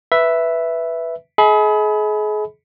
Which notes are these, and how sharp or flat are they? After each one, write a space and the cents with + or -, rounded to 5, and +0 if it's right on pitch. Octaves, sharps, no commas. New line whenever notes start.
B4 +0 E5 +0
G#4 +35 D#5 +40 B5 +0